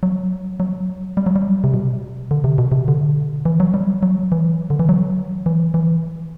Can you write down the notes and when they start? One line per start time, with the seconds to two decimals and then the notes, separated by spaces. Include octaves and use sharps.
0.03 F#3
0.60 F#3
1.17 G3
1.26 F#3
1.36 G3
1.64 C3
1.74 B2
2.31 D3
2.44 C3
2.58 B2
2.72 C3
2.88 D3
3.45 E3
3.60 F#3
3.74 G3
4.03 F#3
4.32 E3
4.70 D3
4.80 E3
4.89 F#3
5.46 E3
5.74 E3